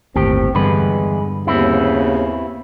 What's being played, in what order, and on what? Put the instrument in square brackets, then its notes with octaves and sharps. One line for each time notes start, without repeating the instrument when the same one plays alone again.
[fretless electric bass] G1 D#2 [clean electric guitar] A2 G4 [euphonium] C4
[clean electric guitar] E2 B4 [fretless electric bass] G2 D3 [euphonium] G#3
[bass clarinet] D#2 [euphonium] C#3 [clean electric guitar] B3 C4 E4